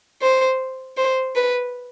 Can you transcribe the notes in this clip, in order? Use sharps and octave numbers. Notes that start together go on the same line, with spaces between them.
C5
C5
B4